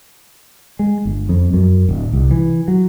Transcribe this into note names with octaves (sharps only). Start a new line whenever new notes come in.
G#3
G1
F2
F#2
D1
C2
E3
F#3